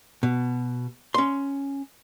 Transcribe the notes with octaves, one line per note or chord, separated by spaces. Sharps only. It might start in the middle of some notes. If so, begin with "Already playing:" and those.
B2
C#4 C6